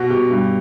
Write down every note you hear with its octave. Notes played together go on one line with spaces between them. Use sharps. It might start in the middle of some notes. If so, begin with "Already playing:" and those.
Already playing: B2 F#4
B2 G4
G2